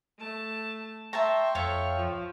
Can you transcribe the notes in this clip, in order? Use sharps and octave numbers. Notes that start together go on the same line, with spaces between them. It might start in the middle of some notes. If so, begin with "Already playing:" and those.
A3 A5
E5 G5 A5 A#5 C6 C#6
F2 A4 C#5 E5 F5
F3